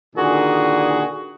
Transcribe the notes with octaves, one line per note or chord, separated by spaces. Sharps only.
A#2 D3 D#3 F#4 G#4